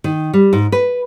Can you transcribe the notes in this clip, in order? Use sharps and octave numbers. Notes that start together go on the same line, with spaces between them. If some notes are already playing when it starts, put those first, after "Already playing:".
D#3
G3
G#2
B4